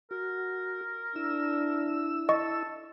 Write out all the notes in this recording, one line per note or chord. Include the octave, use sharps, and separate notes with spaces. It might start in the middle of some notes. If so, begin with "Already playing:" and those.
F#4 A#4
D4 E4 E6
A4 D#5 C#6